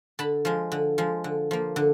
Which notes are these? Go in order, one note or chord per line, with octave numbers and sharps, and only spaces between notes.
D3 A5 B5
F3 G#3
D3
F3 G#3
D3
F3 A#3
D3